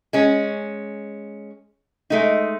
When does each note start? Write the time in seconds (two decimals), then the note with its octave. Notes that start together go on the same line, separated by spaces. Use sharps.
0.13 G#3 C#4
2.10 G#3 A3 D#4